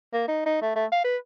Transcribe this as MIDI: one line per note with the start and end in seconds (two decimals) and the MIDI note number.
0.13 0.26 58
0.28 0.46 63
0.46 0.61 63
0.62 0.75 57
0.76 0.86 57
0.92 1.02 77
1.05 1.17 71